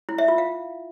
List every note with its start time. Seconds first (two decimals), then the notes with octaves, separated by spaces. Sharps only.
0.09 E4
0.18 E5
0.28 F4
0.38 F5